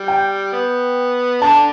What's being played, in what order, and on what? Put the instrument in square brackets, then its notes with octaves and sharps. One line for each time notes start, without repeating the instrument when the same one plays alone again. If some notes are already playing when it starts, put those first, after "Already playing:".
Already playing: [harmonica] G3
[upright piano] G5
[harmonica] B3
[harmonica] D3 D4 [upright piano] A5